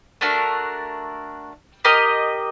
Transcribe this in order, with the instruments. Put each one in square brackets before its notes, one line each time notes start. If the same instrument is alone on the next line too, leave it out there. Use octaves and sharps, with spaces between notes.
[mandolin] A3 D4 F#4 A#4
G4 A#4 D#5